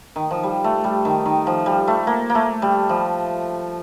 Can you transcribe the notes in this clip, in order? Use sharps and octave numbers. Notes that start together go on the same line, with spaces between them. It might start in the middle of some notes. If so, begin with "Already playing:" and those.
D#3
F3
G3
A3
G3
D#3
D#3
F3
G3
A3
A#3
A#3
A3
G3
F3